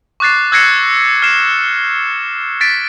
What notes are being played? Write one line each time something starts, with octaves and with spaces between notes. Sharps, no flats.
C#6 D6 F#6 A6 C7
E6 F#6 G#6 A#6 C7 C#7
F6 C7 E7
A6 B6 D7